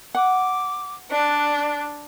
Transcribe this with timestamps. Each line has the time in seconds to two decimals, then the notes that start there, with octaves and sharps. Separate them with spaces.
0.15 F#5 D6
1.11 D4 D5 F#6